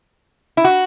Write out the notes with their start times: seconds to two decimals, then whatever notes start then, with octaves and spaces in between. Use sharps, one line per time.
0.57 E4
0.64 F#4